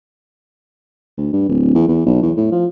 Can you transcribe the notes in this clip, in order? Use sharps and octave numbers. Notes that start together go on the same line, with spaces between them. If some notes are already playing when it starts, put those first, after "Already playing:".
D2
G2
D1
E2
E2
B1
E2
A2
F3